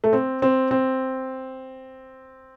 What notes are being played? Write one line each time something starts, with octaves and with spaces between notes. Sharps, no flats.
A3
C4
C4
C4